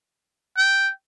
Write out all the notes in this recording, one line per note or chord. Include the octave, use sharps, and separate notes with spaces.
G5